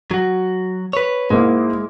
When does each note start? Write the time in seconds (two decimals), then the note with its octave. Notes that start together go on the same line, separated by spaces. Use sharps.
0.11 F#3 F#4
0.93 B4 C#5
1.30 G#2 G#3 A#3 E4